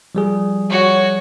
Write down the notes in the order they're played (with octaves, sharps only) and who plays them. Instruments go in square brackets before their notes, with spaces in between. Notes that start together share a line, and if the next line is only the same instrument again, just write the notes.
[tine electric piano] F3 G3 G#4
[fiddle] F#4 C#5